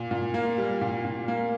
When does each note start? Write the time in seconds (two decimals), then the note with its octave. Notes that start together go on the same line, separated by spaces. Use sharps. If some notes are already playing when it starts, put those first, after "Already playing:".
Already playing: A#2
0.11 A#2
0.34 A#3
0.58 G3
0.81 A#2
1.05 A#2
1.28 A#3